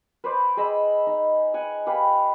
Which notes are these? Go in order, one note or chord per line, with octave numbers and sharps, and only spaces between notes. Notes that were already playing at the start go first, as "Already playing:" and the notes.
B4 C5 D5
G#4 D#5 B5 E6
D#4
F#5 G#5
G4 B4 F5